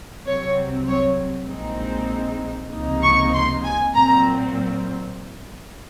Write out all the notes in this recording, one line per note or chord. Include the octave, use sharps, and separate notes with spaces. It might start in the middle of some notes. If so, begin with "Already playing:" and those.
C2 C3 F#3 C4 C#5
C#5
A#1 A#2 G#3 C4 D#4
C#2 C3 F3 A#3 D#4
C#6
C6
G#5
A#2 F#3 C4 A#5